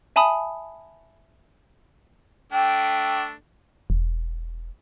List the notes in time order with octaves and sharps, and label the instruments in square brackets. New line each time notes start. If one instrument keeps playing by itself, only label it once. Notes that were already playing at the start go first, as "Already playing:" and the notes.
[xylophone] E5 G#5 A5 B5 D#6
[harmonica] A3 D4 [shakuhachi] G5
[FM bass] E1